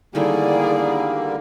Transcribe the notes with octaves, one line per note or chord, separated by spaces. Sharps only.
D3 D#3 G3 A3 A#3 E4 G#4 D5